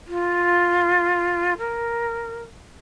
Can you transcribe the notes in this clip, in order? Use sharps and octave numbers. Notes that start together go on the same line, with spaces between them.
F4
A#4